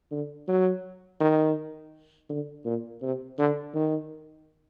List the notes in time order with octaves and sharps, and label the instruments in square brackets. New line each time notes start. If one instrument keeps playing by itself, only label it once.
[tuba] D3
F#3
D#3
D3
A#2
C3
D3
D#3